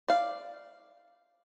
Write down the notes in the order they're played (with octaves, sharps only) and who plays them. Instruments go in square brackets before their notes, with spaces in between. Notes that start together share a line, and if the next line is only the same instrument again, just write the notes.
[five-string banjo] D5 F5